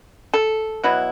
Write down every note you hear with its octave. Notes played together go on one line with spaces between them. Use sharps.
A4
B2 F#3 B3 E4